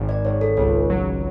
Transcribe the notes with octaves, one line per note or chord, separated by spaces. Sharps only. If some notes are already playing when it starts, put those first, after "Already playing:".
Already playing: G#1
D5
G#1 C#5
A4
C#2 C#5
F#3